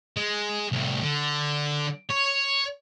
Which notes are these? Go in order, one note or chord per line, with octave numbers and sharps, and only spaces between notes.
G#3
C2 A2
D3
C#5